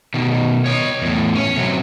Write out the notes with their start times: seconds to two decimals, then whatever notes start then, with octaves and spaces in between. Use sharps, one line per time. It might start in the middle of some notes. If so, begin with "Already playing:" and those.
0.14 B2 D#3
0.66 C#5 D#5
1.01 E2 A2
1.35 C#4 C#5
1.57 C3 F#3